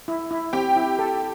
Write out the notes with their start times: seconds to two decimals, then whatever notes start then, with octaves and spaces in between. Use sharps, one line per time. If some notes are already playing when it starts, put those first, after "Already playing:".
0.08 E4
0.31 E4
0.53 C4 G4 G5
0.76 E4
0.99 A4